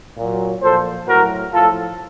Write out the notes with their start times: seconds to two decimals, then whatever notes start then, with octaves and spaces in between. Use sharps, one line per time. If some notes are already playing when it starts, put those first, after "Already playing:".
0.17 A#2 F#3
0.62 A#2 F3 A4 C5
1.07 A2 F#3 F#4 A#4
1.52 A2 F3 F4 A4